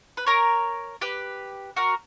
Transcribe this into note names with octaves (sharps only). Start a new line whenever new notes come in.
B4
A#4 C#5
G4 B4
F#4 A#4